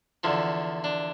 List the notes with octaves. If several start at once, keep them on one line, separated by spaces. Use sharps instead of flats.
E2 D3 F3
D4